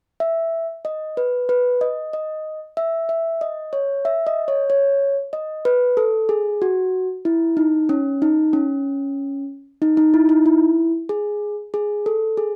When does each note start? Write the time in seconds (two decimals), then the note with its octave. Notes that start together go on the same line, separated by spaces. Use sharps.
0.20 E5
0.85 D#5
1.17 B4
1.49 B4
1.81 D#5
2.13 D#5
2.77 E5
3.09 E5
3.41 D#5
3.73 C#5
4.05 E5
4.27 D#5
4.48 C#5
4.70 C#5
5.33 D#5
5.65 B4
5.97 A4
6.29 G#4
6.62 F#4
7.25 E4
7.57 D#4
7.89 C#4
8.22 D#4
8.53 C#4
9.82 D#4
9.97 D#4
10.14 E4
10.29 D#4
10.46 E4
11.09 G#4
11.74 G#4
12.06 A4
12.37 G#4